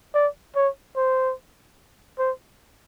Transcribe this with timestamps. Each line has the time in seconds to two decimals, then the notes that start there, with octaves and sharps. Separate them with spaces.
0.15 D5
0.56 C#5
0.97 C5
2.19 C5